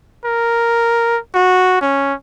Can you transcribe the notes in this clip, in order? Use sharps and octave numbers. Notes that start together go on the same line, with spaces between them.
A#4
F#4
C#4